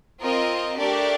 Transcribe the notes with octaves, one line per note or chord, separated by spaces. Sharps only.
C4 F4 A#4 D#5
A3 D4 G4 A#4 D5